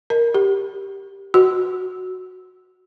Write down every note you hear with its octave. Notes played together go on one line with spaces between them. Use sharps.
A#4
G4
F#4